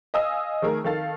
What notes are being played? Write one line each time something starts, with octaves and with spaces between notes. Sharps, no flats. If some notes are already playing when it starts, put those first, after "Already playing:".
D#5 F5 G#5 D#6 E6
D#3 A3 G#4 A#4
D#3 A4 F5 A6